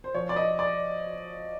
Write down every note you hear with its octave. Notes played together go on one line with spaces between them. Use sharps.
C5
F3 C#5
D5
D#5
D5